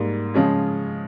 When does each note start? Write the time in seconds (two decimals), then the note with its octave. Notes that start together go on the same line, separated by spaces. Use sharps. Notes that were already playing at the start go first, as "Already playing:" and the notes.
Already playing: G#2 G3 A#3
0.34 C#3 F3 G#3 C#4